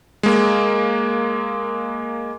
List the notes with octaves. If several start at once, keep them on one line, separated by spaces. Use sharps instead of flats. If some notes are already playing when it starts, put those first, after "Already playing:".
G#3 A#3